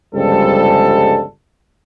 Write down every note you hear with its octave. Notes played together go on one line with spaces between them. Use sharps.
G1 C#2 F3 G3 G#3 A4